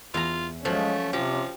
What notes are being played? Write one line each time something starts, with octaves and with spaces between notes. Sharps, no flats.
E2 F4 A#5
F3 F#3 G#3 A3 C#4
C3 F3 G4